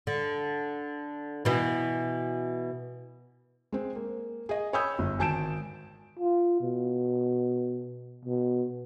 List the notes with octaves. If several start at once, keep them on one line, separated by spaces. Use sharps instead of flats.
D3
B2 E3
G#3 C4
A#3
G#4 D#5
C#5 G#5 B5 D#6 E6 G6
G1
G#1 G#5 A5 G6 D7 E7
F4
B2
B2